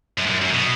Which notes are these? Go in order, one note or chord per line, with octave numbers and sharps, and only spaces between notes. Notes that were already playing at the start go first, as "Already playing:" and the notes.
F#2
G#2
F#2
F#2
B2